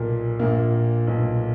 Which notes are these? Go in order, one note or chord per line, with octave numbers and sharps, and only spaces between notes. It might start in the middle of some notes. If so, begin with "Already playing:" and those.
Already playing: B1 A#2 A#3
A#1 A#2 A#3
B1 A#2